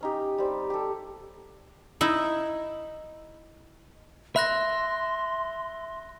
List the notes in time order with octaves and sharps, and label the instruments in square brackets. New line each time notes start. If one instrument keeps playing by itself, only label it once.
[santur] C#4 D#4 G4
G3 C4
G4 A4
[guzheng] D#4 E4
[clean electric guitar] E5 [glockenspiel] B5 F#6 A#6 [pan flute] C6